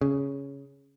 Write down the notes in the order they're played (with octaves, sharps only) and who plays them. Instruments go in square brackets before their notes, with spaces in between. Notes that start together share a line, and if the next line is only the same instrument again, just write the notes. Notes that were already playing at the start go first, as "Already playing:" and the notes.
[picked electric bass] C#3